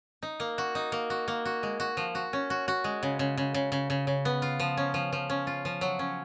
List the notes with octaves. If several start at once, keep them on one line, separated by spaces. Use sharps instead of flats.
D#4
A#3
F#4
D#4
A#3
F#4
A#3
F#4
G#3
F#4
F3
F#4
C#4
F#4
F#4
G#3
C#3
C#3
C#3
C#3
C#3
C#3
C#3
B3
F4
F3
C#4
F3
F3
C#4
F4
F3
F#3
C#4